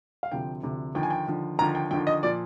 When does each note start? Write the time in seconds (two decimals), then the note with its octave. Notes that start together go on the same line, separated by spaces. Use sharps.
0.23 F5
0.31 D2 C3 F3 G5
0.63 D2 C3 F3
0.95 D#2 D3 F3 G5
1.03 G#5
1.10 G5
1.27 D#2 D3 F3
1.59 D#2 D3 F3 A#5
1.75 G5
1.91 D#2 D3 F3 G5
2.07 D#5
2.23 A#2 F3 D5